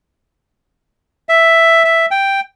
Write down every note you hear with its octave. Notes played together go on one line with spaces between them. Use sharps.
E5
E5
G5